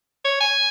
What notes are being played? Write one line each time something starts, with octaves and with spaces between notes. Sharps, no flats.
C#5
G#5